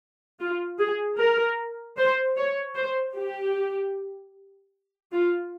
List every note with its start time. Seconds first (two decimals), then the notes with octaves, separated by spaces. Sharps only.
0.40 F4
0.79 G#4
1.19 A#4
1.98 C5
2.37 C#5
2.76 C5
3.16 G4
5.12 F4